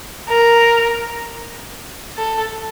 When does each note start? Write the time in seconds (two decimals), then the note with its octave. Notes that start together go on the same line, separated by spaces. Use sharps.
0.28 A#4
2.17 A4